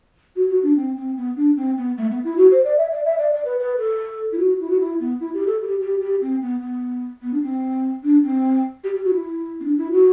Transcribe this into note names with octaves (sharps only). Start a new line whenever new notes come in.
F#4
F#4
D4
C4
C4
B3
D4
C4
B3
A3
B3
E4
F#4
C5
D5
E5
D5
E5
D5
D5
B4
B4
A4
E4
F#4
E4
F#4
E4
B3
E4
G4
A4
G4
G4
G4
C4
B3
B3
B3
D4
C4
D4
C4
G4
G4
F#4
E4
C4
D4
E4
F#4